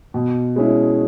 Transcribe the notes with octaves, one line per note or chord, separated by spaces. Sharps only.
B2
G#3 C#4 E4